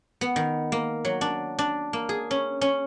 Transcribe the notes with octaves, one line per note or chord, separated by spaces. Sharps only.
B3
D#3
A#3
F#3
D4
D4
A#3
G#4
C#4
C#4